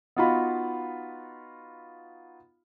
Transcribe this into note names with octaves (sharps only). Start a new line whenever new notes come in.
B3 D#4 F4 F#4 F5 B5